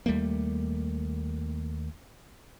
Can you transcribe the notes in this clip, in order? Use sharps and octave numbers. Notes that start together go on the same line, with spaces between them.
D#2 G3 A3 A#3